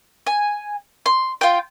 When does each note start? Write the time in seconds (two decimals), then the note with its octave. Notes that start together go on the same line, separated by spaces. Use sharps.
0.27 G#5
1.06 C6
1.41 F4 G5